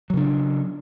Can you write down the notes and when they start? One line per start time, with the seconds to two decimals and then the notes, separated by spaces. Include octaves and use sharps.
0.10 F#3
0.14 C#3
0.17 D4